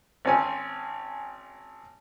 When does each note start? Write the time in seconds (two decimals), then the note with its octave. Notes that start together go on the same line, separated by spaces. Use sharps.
0.25 G#1 C4 C#4 G#5